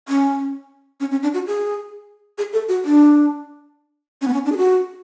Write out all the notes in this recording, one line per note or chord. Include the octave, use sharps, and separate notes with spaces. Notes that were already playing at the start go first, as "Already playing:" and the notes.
C#4
C#4
C#4
D4
F#4
G#4
G#4
A4
F#4
D4
C#4
B3
C#4
D4
G#4
F#4